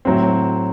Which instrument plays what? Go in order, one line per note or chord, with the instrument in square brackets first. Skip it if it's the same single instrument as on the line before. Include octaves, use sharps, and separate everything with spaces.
[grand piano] A2 F#3 C4